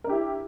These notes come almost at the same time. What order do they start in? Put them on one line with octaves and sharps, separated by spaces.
A#4 D4 G4 E4